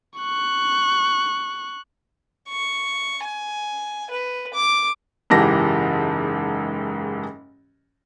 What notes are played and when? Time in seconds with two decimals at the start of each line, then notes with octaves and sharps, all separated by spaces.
0.18 C#6 F#6
2.48 C#6
3.24 G#5
4.10 B4
4.54 D6
5.30 F#1 G#2 E3 G4 A5 A#6